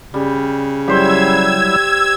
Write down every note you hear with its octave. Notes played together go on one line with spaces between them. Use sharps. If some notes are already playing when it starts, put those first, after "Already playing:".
C#3 G3
F#3 G3 E4 G4 C5 E6 G#6